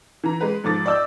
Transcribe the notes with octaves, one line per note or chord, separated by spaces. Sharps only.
E3 A#5
G#3 B4
G#2 F3 A4 D6 A6
D5 D#5 D6 E6 G6